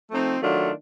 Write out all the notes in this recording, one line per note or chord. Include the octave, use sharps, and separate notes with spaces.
F3 A3 C4 D#4
D#3 F#3 A3 D4 F4